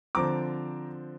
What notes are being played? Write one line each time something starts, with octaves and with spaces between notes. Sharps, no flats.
D3 F3 C4 A#5 D6